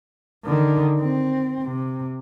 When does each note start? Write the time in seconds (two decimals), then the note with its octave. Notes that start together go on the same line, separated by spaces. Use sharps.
0.44 D3 D#3
1.01 C4
1.64 C3